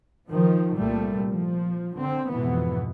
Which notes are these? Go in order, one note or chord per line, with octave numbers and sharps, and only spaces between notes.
D#3 F3
C2 A#2 G3 A3
F3
D3 C4
F2 G#2 B2 E3 B3